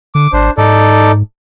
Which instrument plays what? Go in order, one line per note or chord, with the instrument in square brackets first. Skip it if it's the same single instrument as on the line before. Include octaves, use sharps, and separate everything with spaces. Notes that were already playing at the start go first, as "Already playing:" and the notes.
[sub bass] D3 [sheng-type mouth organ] D6
[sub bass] G#1 [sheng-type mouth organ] D4 C5
[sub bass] G#2 [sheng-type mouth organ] D#4 A4 D5